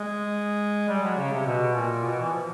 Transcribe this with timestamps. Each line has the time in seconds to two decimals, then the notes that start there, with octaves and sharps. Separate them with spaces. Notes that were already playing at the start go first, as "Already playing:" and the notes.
Already playing: G#3
0.88 G3
1.03 F#3
1.17 C#3
1.32 C3
1.46 B2
1.75 A#2
2.05 B2
2.19 E3
2.33 F3